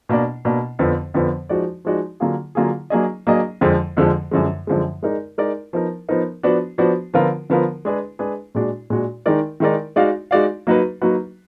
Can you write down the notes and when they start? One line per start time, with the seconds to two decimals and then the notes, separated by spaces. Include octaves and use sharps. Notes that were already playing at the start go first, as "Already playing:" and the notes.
0.09 B2 A#3 D4
0.45 B2 A#3 D4
0.79 F2 D3 F3 B3
1.14 F2 D3 F3 B3
1.49 F3 G#3 D#4 F#4 D5
1.85 F3 G#3 D#4 F#4 D5
2.20 D3 F#3 A#3 F4 G#4
2.55 D3 F#3 A#3 F4 G#4
2.90 F#3 A#3 D4 G#4 D#5
3.27 F#3 A#3 D4 G#4 D#5
3.61 F2 D3 F3 G#3
3.97 F2 D3 F3 G#3
4.31 F#2 D3 F3 G#3
4.67 F#2 D3 F3 G#3
5.03 G#3 D#4 A#4 D5
5.38 G#3 D#4 A#4 D5
5.73 F3 B3 D#4 A#4
6.09 F3 B3 D#4 A#4
6.43 F3 B3 D4 F#4
6.78 F3 B3 D4 F#4
7.14 D3 F3 B3 F4 A#4
7.50 D3 F3 B3 F4 A#4
7.85 G#3 D4 G#4 B4
8.19 G#3 D4 G#4 B4
8.55 A#2 G#3 D4 F#4
8.90 A#2 G#3 D4 F#4
9.26 D#3 G#3 D#4 A#4 D5
9.60 D#3 G#3 D#4 A#4 D5
9.96 G#3 D#4 F#4 D5 F5
10.31 G#3 D#4 F#4 D5 F5
10.67 F#3 A#3 D#4 F#4 B4
11.01 F#3 A#3 D#4 F#4 B4